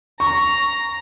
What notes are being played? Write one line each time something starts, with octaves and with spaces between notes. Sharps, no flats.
A#5 C#6